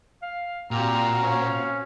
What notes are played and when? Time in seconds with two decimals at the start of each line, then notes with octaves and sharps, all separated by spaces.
0.22 F5
0.71 A#2 C4 F#4 G4 F5 A#5
1.19 C#4